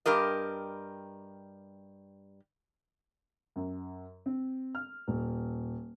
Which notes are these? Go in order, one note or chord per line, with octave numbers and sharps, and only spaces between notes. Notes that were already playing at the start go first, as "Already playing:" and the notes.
G2 G4 A#4 D#5
F#2
C4
F6
D#1